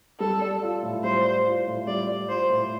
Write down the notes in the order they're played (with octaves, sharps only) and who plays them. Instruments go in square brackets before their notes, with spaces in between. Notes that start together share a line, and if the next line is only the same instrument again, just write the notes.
[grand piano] G3 [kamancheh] A4
[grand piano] D5
F4
A2
[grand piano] G3 [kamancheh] C5
[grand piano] D5
F4
A2
[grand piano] G3 [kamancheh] D5
[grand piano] D5
[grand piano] F4 [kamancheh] C5
[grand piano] A2